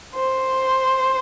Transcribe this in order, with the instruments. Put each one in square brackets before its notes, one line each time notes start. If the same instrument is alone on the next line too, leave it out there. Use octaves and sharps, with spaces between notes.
[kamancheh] C5